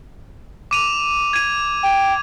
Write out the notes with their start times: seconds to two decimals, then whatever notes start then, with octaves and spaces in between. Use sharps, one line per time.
0.71 D6 D#7 F7
1.33 G#6 D#7
1.83 G5